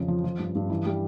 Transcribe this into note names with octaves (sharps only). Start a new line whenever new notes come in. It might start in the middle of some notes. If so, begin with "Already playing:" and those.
Already playing: F2 C#3
F3
F3
G2
G2
E3
G3